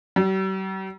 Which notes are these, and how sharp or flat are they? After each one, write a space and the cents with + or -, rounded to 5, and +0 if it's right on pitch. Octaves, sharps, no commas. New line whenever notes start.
G3 -45